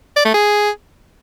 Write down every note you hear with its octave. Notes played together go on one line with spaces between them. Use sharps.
D5
A3
G#4